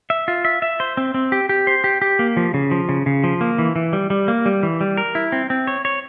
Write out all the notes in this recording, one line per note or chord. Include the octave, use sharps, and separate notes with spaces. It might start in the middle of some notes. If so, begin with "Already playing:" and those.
E5
F4
E5
E5
C5
C4
C4
G4
G4
C5
G4
G4
A#3
F3
C#3
F3
C#3
C#3
F3
A#3
E3
E3
G3
G3
A#3
G3
E3
G3
A#4
E4
C4
C4
C#5
C#5